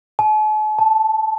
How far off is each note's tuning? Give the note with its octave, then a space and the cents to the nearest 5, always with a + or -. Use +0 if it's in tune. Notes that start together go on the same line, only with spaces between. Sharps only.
A5 -45
A5 -5